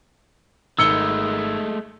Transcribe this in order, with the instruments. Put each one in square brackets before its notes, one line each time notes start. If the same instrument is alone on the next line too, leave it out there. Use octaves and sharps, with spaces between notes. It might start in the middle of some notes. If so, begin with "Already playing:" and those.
[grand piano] G#1 C#7 G7 [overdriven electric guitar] G#3 A3 [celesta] E6